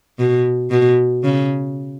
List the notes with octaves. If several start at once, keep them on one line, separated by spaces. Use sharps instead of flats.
B2
B2
C#3